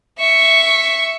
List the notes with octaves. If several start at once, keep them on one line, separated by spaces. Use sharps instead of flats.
E5 C#6